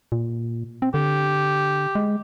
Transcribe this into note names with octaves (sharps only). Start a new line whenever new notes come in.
A#2
C4
D3 G4
G#3